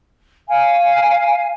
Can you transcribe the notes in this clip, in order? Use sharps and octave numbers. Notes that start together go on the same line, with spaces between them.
F5 G#5